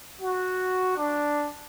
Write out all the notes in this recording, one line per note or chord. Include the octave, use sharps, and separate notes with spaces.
F#4
D4